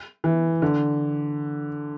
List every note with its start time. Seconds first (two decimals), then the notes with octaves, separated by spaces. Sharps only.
0.24 E3
0.62 D3